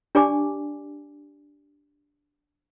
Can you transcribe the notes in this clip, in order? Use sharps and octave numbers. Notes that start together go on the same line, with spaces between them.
D4 G4 D5 G#5 A5 D6